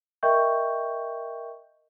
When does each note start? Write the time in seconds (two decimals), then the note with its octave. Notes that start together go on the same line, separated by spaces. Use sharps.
0.23 A#4 D#5 E5 G5 C#6 G6